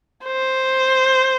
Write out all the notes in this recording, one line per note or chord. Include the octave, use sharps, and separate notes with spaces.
C5